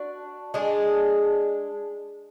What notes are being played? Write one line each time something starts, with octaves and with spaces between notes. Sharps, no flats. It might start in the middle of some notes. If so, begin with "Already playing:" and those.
Already playing: D4 F#4
G#3 D4 G#4